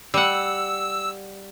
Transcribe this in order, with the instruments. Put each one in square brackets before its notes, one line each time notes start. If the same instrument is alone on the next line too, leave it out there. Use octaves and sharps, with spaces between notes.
[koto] G3 F#5 [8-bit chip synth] E6